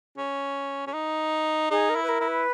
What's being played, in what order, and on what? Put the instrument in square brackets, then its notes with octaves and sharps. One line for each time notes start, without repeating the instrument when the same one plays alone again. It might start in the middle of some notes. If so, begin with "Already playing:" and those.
[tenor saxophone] C#4
C#4
D#4
[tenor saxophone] D#4 [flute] G#4
[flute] A#4
[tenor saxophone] E4
[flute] B4
A#4
[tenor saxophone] E4
[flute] B4